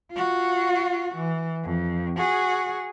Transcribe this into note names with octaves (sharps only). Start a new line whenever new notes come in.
F4 F#4
E3
F2
F#4 G#4